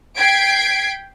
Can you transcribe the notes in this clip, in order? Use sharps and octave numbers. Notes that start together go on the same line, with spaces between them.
G5 G#6 B6 C7 D7